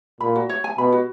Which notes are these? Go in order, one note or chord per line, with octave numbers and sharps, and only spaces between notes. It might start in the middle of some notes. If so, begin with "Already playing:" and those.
A#2 B5
F#4
C#5
G#5
B2 B5
F#4